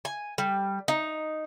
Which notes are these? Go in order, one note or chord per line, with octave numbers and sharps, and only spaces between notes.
G#5
G3
D#4